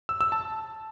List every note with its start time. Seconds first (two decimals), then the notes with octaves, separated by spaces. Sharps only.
0.09 E6
0.21 E6
0.32 A5